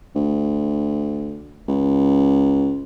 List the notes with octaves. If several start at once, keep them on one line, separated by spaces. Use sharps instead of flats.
D2
C#2